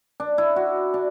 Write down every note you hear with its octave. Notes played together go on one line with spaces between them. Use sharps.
D4
E4
F#4
D4